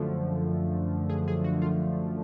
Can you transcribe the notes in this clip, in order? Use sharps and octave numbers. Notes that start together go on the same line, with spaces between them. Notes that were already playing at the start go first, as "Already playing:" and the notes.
Already playing: F#2 D3 F3 A3
G#4
G#4
F#4
F4